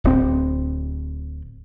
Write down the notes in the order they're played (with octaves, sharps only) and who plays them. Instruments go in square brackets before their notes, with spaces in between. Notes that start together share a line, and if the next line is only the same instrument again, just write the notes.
[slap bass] D1 C4